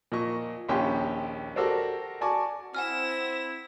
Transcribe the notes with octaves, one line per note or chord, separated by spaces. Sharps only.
A#2 F3 D#5 C#6
A#1 D#2 C#4 G4 G5 C6
F#4 G4 A4 A#4 C5 D5
F#4 D5 G#5 A5 C#6 D6
C4 E4 F#5 G#5 F6 A#6 E7